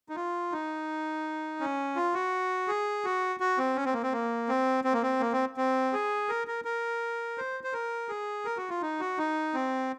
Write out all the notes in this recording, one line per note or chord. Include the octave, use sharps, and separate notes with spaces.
D#4
F4
D#4
C#4
F4
F#4
G#4
F#4
F#4
C4
C#4
C4
A#3
C4
A#3
C4
C4
A#3
C4
A#3
C4
C4
G#4
A#4
A#4
A#4
C5
C5
A#4
G#4
A#4
F#4
F4
D#4
F#4
D#4
C4